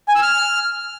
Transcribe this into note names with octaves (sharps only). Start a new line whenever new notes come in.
G#5
E6
F6